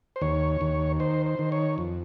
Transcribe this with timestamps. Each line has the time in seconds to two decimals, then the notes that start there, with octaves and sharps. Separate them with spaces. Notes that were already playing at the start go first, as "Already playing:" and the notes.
0.16 C5
0.21 D#2 C#5
0.61 D#2
1.00 D#3 C5
1.26 C5
1.39 D#3
1.52 C#5
1.78 F2